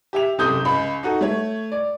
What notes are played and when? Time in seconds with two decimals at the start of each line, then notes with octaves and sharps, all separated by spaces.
0.13 G4 E5 F7
0.38 F#1 C3 A4 D#6 G6
0.65 C#2 B5
1.03 D#4 F#4 A4
1.21 A3 C#5
1.72 D5